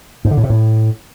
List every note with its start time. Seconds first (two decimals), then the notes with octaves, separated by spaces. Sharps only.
0.25 G#2
0.31 D3
0.37 A2
0.44 C3
0.50 A2